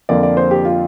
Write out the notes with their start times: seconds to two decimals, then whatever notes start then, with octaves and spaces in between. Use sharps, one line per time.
0.09 F2 D3 A#3 D5
0.23 D5
0.37 C5
0.51 G4
0.65 F4